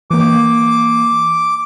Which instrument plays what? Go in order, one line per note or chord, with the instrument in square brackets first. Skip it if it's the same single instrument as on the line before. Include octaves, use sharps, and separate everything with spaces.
[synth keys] E3 A#3 [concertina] D6